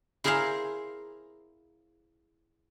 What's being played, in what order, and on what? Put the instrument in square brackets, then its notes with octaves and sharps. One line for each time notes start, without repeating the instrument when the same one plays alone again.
[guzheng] E4 G#4 A#4 C5 E5 F5